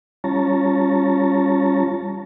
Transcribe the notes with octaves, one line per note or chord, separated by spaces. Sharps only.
G3 C#4 F4 C#5 A5 A#5